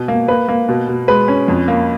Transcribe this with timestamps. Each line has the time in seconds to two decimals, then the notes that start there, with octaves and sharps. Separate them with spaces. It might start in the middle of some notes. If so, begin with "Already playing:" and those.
Already playing: B2
0.08 A#3
0.28 A#3 B4
0.48 A#3
0.69 B2
0.88 B2
1.08 G#3 B4
1.28 C#4
1.48 F2
1.68 A#3